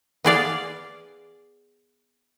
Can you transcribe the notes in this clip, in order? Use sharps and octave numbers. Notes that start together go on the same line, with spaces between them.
B3 G#4 D5 F5